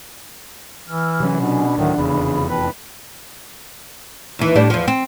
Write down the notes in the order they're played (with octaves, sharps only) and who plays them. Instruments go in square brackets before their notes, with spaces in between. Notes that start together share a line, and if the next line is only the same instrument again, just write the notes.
[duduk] E3 [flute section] E6 F6
[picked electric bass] C3 F#3 C#4
[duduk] B2 [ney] D4 [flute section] F#5 G#5 B5
[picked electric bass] D2 A2 F#3 [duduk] D#3 [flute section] E5 F#5 G5
[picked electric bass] F1 E2 [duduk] C#3 [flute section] G#4 B5
[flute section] F4 G5 A5 [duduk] B4
[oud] D#2 E3
A2 G3 D4
E2 F3
C4